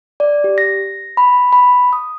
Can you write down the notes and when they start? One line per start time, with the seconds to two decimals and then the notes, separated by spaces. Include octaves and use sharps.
0.20 D5
0.44 G4
0.58 A#6
1.17 B5
1.53 B5
1.93 D#6